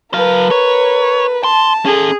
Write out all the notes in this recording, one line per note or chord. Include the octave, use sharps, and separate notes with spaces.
F#3 A#4 B4 F5
C#5
A5 C6
C#4 G#4 A4